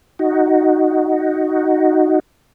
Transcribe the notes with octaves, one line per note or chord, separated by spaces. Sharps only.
D#4 F#4